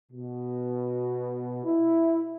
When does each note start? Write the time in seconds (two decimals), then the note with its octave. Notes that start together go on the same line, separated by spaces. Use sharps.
0.12 B2
1.65 E4